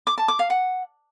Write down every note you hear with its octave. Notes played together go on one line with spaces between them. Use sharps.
D6
A5
D6
F5
F#5